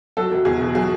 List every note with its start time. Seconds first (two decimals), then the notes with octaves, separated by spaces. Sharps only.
0.17 F#3 A4
0.32 E1
0.45 E2 G#4
0.60 B2
0.75 F#3 G#4